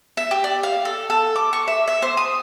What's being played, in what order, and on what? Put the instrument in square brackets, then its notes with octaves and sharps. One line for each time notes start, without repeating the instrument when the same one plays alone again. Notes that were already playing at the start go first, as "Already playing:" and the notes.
[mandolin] E5
G4
D5
F5
A4
A4
D6
C#6
E5
E5
C5
D#6